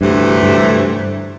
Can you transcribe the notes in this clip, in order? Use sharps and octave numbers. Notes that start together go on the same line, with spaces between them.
D2 G2 C3 E3 A3
G2